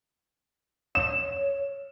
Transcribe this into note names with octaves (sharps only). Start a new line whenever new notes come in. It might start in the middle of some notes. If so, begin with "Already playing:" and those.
C#5 E7